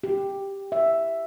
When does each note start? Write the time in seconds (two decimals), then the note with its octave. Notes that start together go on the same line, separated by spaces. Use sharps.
0.03 G4
0.72 E5